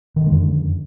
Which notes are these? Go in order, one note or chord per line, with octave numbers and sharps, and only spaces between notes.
F2 D3 D#3 G#3